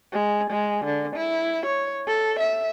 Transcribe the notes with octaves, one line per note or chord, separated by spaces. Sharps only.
G#3
G#3
D3
E4
C#5
A4
E5